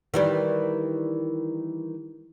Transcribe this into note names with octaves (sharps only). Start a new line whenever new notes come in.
D#3 E3 G3